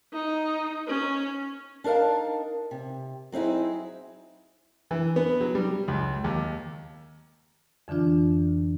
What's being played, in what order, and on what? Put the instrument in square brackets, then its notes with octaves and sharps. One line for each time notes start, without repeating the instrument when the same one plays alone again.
[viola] D#4
C#4
[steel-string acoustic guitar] D4 D#4 A#4 F5 A5
C3
F#3 C4 D#4 E4 G#4
[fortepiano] E3
B3
F#3
G3
C#2
D#2
[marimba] F2 D3 E3 D4 F4